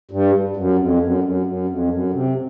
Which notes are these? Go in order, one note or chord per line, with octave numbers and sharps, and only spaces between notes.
G2
F#2
F2
F#2
F#2
F#2
F2
F#2
C3